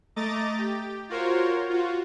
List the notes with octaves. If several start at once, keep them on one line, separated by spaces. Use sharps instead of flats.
A3 D#5 A#5 D6 A6
G4
F4 F#4 A#4 C5 C#5
F4 F#4